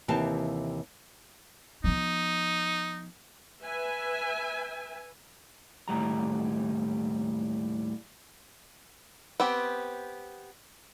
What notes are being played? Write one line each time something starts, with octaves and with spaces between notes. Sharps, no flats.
D#2 C3 E3 G4 F5 A5
F3 B3 D#4
B4 E5 G#5
D#2 A2 G3 A#5
B3 C4 G4